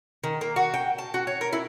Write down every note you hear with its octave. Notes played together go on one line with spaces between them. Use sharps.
D#3
A#3
F#4
G5
A5
F#4
C#5
A#4
E4